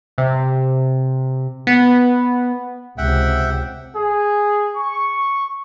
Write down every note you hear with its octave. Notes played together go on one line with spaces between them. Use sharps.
C3
B3
C#2 C3 E5 F#5 G5
G#4
C#6